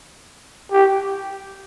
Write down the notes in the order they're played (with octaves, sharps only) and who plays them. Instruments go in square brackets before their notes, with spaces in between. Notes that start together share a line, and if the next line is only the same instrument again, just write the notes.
[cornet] G4